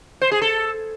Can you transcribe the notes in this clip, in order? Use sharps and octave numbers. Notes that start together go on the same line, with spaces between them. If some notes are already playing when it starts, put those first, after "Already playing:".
C5
G#4
A4